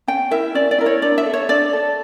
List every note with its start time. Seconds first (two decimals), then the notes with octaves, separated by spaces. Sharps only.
0.08 C#4 G5
0.31 E4 A#4 E5
0.55 C#4 D5
0.71 D5
0.78 E4 A#4
0.86 C#5
1.02 D4 D5
1.18 E5
1.26 A4
1.34 C#5
1.49 D4 D5
1.73 A4